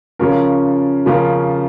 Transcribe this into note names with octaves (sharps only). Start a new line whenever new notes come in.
C#3 F3 C#4 F4 A#4
C#3 F3 C#4 F4 A#4